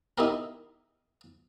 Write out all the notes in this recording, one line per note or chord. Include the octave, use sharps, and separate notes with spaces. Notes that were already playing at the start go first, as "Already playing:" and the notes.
D#4 E4 G4 A#4